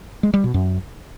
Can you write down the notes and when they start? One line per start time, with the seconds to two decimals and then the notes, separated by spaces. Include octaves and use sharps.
0.23 G#3
0.34 G3
0.44 B2
0.54 F#2